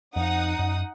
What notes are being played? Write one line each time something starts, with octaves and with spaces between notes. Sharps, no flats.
F2 F3 D#4 F#5 D#6
F#2